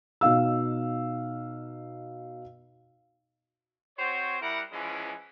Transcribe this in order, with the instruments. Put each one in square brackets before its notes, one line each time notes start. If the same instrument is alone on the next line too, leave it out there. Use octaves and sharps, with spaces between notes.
[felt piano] B2 D#4 F5 E6
[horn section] C4 F#4 C5 C#5
G3 E4 A#4 F#5
E3 F3 G#3 B3 C#4 E4